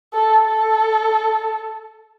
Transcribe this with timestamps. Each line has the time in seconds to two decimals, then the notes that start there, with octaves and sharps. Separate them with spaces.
0.13 A4
0.46 A4